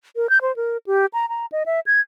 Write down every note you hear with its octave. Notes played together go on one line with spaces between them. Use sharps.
A#4
G6
C5
A#4
G4
A#5
A#5
D#5
E5
G#6